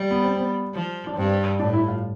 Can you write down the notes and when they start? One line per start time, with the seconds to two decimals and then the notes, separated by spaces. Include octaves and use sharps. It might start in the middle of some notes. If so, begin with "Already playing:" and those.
Already playing: G3
0.11 B3
0.24 C4
0.36 B3
0.75 F3
1.07 D4
1.17 G2 C4
1.59 A2 D4
1.73 E4
1.88 F4